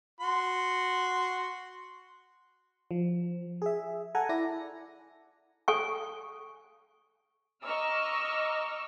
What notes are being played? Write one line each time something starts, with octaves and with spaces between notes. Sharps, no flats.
F#4 C6
F3
G#4 E5
A4 F#5 G#5 A#5
E4 D5 A#6
A4 G#5 C#6
D#5 A#5 C#6 D6 E6 F6